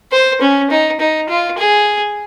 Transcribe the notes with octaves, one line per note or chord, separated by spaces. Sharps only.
C5
C#4
D#4
D#4
F4
G#4